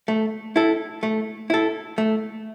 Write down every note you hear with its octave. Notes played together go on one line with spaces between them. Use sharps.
A3
E4 A4
A3
E4 A4
A3